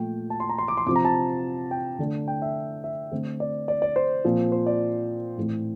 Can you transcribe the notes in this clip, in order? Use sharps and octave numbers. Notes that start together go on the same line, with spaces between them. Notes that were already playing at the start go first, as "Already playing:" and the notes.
Already playing: A#2 F3 A3 G5
A5
C6
A#5
C6
D6
C6
C3 F3 C4 D6
A#5
A5
G5
D3 A3 D4
G5
E5
E5
D3 A3 C4
D5
D5
D5
C5
A#2 F3 C4
C5
D5
A2 E3 A3 C4